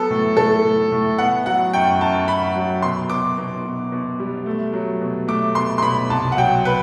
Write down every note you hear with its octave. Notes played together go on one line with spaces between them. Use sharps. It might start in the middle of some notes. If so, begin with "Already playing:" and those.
Already playing: F#3 B3 A4
A2
A2 A4
A2
A2
B3 F#5
F#3 F#5
F#2 G5
F#2 A5
F#2 B5
F#3
B2 C6
B2 D6
B2
B2
B2
G3
A3
F#3
B2
A3 D6
B2 C6
C6
B2 B5
C2 A5
F#5
F#3 G5
B4